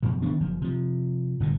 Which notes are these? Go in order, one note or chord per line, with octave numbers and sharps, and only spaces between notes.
F#2 B2 F3
D#3 B3 C#4 D4
F#1 F3
C3 F3
G1 G#2 B2